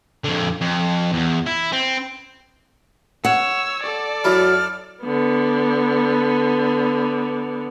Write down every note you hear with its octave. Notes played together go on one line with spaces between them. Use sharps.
F2 D3
F2
E2
E4
C4
C#5 F#5 E6
A4 D5
F#2 F#3 E4 F6
D3 B3